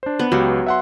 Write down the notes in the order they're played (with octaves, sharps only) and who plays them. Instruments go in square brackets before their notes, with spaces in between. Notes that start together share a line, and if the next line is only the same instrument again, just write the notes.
[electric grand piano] D4 C5
[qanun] B3
[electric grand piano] C#2 G4 [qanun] F#3
[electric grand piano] E5 F#5 C6